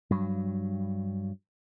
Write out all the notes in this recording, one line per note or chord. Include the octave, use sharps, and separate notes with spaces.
G2 F#3